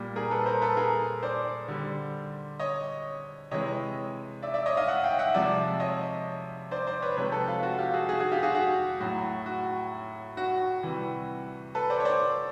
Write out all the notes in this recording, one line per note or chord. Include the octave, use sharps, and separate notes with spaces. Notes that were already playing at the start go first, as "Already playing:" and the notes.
Already playing: A#2 G3
G#4 A#4
A4 B4
A#4 C5
A4 B4
G#4 A#4
C5 D5
D3 G3
C#5 D#5
C3 E3 G#3 C#5 D#5
D5 E5
D5 E5
C#5 D#5
D#5 F5
E5 F#5
F5 G5
E5 F#5
C3 F3 G#3 D5 E5
C#5 D#5
C5 D5
C5 D5
B4 C#5
C3 F3 G#3 B4 C#5
A4 B4
F4
F#4
F4 G4
F#4 G#4
F#4 G#4
F#4 G#4
F4 G4
F#4 G#4
F#4 G#4
A2 F#3 F#4
F#4
F#4
C3 E3 G3
A4 B4
C5 D5
C#5
C5 D5